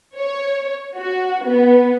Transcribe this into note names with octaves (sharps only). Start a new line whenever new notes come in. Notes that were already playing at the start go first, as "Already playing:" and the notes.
C#5
F#4
B3